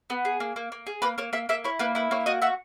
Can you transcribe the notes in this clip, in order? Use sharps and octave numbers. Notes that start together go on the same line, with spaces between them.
B3
G#4
A#3
A#3
A#3
G#4
A#3 B4
A#3 C#5
A#3 E5
A#3 E5
E4 C#5
A#3 B4
E4 B4
A#3 C#5
F#4 D#5
F#4 E5